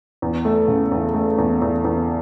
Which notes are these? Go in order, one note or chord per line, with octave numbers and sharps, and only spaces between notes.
E2
A3
C#3
E2
A3
E2
E2
E2